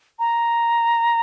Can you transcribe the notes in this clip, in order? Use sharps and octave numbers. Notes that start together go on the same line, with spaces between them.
A#5